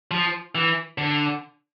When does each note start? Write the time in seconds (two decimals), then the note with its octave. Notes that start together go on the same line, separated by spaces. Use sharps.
0.11 F3
0.55 E3
0.98 D3